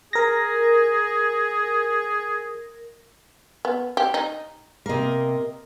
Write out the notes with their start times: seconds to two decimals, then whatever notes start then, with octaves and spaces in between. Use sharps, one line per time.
0.13 G#4 A#4 A#6
3.65 B3
3.97 G4
4.14 D#4
4.86 C3 A#3 A#4 D#5